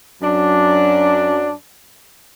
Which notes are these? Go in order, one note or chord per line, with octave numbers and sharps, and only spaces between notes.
F#2 F#3 D4